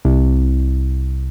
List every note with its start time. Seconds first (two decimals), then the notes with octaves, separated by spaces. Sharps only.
0.05 C2